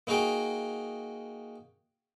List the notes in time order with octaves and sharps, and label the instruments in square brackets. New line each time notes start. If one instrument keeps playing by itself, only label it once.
[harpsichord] A#3 D#4 F#4 G#4 G5